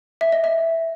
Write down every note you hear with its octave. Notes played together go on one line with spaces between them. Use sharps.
E5
D#5
E5